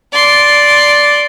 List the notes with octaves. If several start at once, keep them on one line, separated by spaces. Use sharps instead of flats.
D5 C6